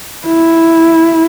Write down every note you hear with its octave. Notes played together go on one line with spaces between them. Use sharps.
E4